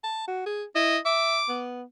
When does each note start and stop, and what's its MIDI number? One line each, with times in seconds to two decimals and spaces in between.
0.03 0.24 81
0.28 0.46 66
0.46 0.64 68
0.75 0.98 64
0.75 0.97 75
1.05 1.38 76
1.05 1.63 86
1.48 1.82 59